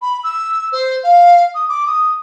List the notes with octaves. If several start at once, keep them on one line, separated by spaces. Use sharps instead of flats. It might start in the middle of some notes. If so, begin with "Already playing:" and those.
B5
E6
C5
F5
D#6
D6
D#6